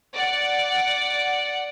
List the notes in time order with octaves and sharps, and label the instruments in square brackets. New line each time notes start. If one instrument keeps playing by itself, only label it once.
[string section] D5 F#5